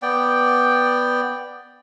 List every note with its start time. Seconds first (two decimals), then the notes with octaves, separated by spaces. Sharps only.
0.02 B3 D5 G5